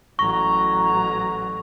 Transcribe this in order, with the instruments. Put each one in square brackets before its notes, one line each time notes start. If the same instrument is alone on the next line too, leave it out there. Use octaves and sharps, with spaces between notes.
[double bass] A1 F#3 [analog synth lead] A#5 [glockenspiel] C#6